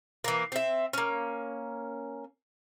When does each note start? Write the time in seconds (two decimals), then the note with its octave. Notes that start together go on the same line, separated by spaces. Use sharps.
0.24 E3 A#3
0.52 C4 E5
0.93 A#3 C#4